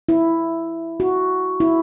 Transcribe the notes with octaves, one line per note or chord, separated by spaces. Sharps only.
E4
F#4
E4